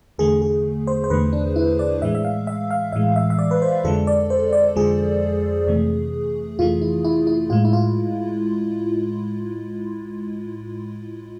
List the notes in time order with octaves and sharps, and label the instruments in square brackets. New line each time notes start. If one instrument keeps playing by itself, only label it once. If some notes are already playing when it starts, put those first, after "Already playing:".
[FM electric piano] E2 D3 A3 G#4
G#4
C5
C5
E2 D3 A3 B4
D4
E4
D5
A2 E3 G#3 E5
E5
F5
E5
F5
A2 E3 G#3 E5
E5
E5
D5
B4
C5
F2 D3 F3 G#3 A4
D5
C5
D5
F2 D3 F3 G#3 G#4
F2 C3 E3 A3
F2 C3 E3 A3 F4
E4
E4
E4
A2 G#3 F4
E4
F4